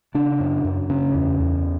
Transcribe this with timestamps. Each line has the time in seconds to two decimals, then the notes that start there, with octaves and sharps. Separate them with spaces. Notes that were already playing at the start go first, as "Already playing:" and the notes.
0.15 C#3 D4
0.40 F#2
0.65 F#2
0.90 C#3 C#4
1.15 E2
1.40 E2